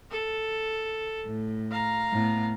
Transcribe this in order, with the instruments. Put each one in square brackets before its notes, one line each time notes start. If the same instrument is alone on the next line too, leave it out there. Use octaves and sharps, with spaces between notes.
[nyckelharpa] A4
[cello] A2
[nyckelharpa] F5 A#5
[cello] A2 B3